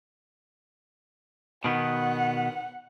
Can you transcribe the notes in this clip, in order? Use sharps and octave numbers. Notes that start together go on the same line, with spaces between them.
B2 D#3 B3 F#5